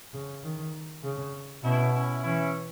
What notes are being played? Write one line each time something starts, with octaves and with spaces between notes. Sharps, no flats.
C#3
D#3
C#3
B2 C#4 E4
C#4 E4
E3 C#4 E4